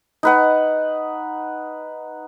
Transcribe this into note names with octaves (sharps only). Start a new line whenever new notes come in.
D#4 B4 F#5